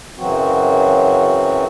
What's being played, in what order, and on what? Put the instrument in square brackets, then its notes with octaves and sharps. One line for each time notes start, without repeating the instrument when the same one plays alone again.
[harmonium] F#2 C#3 E3 F#3 C4 F#4